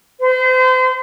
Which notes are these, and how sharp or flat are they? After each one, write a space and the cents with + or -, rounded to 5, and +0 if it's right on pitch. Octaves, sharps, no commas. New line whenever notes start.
C5 -35